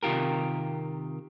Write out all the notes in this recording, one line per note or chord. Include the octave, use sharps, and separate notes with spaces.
C3 D#3 F4 G4 A#4